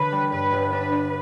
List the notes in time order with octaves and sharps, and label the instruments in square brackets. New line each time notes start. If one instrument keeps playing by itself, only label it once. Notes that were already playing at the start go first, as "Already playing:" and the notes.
Already playing: [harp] D3 [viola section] B4
[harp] G3
[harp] G2 [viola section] B4
[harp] G1
[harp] D4 [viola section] B4
[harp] D4